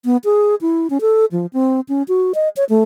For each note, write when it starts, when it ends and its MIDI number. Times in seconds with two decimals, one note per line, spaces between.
0.05 0.17 59
0.25 0.55 68
0.61 0.90 64
0.90 0.98 61
1.01 1.25 69
1.32 1.46 53
1.53 1.80 60
1.89 2.03 61
2.08 2.33 66
2.35 2.49 75
2.57 2.64 73
2.69 2.83 57